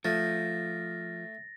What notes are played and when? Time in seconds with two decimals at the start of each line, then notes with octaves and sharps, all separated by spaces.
0.05 F3 A3 A6 A#6